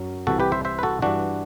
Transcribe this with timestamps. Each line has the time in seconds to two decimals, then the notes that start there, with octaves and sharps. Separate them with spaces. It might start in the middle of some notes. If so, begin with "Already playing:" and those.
Already playing: F#2 F#3
0.27 C2 C3 E3 F#4 A4
0.40 G4 B4
0.52 C5 E5
0.65 C5 E5
0.79 B4
0.83 F#4 A4
1.02 G2 E3 D4 F#4